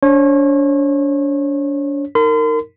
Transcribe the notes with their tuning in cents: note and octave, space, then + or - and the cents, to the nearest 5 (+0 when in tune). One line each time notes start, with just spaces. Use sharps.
D4 -40 C#5 -35
D#4 +0 A#4 -25 C6 -45